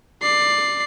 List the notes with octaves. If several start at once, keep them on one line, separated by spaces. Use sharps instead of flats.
D5 C7